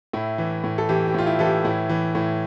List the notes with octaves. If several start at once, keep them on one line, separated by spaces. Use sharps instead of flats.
A2 E4
E3
A2
A4
E3 G4
G4
A2 F4
E4
E3 A4
G4
A2 E4
E3
A2